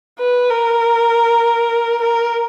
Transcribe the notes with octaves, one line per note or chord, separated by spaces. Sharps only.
B4
A#4
A#4